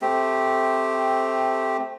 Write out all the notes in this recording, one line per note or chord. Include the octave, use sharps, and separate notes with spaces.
A3 C4 G4